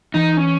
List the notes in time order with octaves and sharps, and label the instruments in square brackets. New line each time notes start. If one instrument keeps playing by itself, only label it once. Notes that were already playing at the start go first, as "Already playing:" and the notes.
[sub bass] E3 [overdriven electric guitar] D#4
[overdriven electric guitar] C#4